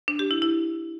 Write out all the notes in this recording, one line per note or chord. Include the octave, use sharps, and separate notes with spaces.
D4
G4
E4
E4